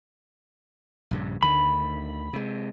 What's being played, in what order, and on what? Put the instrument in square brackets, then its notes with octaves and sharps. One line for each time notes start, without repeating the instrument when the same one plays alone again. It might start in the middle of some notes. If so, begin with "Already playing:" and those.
[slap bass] A#1 G2 C#3
[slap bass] D2 D3 D#3 [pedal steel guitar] B5
[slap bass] C3 G#3